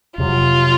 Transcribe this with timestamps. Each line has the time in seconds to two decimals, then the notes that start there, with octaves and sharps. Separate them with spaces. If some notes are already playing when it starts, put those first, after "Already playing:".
0.17 F2 C3 F#3 F4